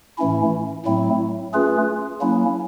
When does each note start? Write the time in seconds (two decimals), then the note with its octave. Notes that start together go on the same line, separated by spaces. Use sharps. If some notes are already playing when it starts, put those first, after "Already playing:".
0.18 A2 E3 A3 C#4 E4
0.85 A2 F#3 A3 C4 E4
1.53 A3 C#4 F4 G#4 B4
2.21 F#3 A#3 C#4 E4